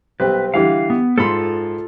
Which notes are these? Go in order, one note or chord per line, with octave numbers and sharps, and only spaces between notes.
B1 G3 C4 B4
D3 E3 G3 F5
B3
G#2 F4 A4 B5 C6